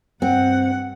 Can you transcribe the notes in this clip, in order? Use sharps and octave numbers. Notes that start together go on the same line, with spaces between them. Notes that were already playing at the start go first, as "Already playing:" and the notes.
G2 C4 F#5